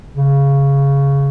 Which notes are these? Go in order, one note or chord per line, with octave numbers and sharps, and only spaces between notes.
C#3